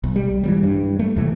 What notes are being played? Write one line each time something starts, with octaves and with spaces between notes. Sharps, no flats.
B1
G3
E3 F#3 G3
G2
A3
D#2 C3 E3 A3